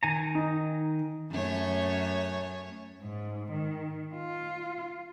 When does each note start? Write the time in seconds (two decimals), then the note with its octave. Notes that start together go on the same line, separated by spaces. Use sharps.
0.03 D#3 G#5 A#5
0.35 D#4
1.31 F#2 A3 C#5
3.02 G#2
3.52 D#3
4.15 F4